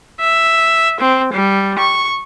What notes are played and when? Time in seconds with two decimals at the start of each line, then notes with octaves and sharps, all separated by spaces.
0.20 E5
1.00 C4
1.33 G3
1.79 C#6